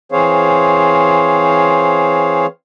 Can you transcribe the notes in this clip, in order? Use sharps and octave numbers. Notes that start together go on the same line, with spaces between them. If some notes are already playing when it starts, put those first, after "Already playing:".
E3 C4 G#4 C5 C#5 F5